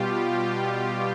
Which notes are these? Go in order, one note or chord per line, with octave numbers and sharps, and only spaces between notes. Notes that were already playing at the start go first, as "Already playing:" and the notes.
Already playing: B2 G3 F4 G4